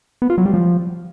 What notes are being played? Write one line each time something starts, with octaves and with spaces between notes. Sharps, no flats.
B3
F4
F#3
G3
F3